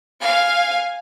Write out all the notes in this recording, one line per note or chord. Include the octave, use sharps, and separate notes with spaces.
F5 G#5